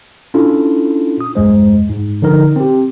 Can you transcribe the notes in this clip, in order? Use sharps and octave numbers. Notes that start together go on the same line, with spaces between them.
C#4 D4 E4 F4 A4
D#6
B1 E2 G2 G#3 C5
G#2
D3 F3 D#4 A#4
C4 G4